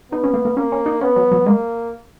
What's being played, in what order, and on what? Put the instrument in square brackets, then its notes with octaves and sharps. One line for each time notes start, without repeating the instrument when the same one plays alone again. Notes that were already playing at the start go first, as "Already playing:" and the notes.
[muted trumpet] B3 [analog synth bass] D#4
[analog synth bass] C#4
A#3
A#3
[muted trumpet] A#3 [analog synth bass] C#4
[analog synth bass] C#4
D#4
[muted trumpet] B3 [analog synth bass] C#4
[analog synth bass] F#3
F#3
[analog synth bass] G#3 [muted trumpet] A#3